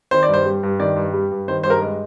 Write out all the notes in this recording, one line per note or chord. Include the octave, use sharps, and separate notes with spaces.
D#3 C5
D5
G2
C5
G3
G2
D#3 D5
G2
G3
G2
D#3 C5
G2 C5
A#4
G#3